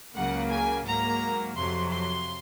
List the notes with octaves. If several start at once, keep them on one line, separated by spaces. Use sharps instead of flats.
C#2 C#3 F#3 A#3 F#5
G#5
G#2 F#3 A#3 A#5
F2 C3 F#3 C6
C6